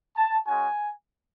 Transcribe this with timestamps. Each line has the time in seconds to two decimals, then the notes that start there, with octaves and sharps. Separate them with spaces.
0.16 A5
0.46 G#3 C#4 F#4 G#5